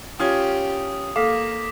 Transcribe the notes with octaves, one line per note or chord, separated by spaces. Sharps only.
C#4 F4 G4 D#6 G#6
A#3 A4 F5 D6 B6